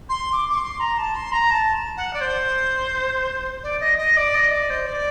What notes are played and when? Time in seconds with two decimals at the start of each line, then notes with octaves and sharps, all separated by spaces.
0.09 C6
0.32 D6
0.49 D6
0.56 C6
0.80 A#5
0.98 A5
1.15 C6
1.32 A#5
1.50 A5
1.97 F#5
2.13 D5
2.21 C5
3.63 D5
3.80 D#5
3.98 D#5
4.16 D5
4.34 D#5
4.51 D5
4.70 C5
4.86 D5